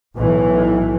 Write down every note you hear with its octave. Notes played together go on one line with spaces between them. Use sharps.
B1 A2 E3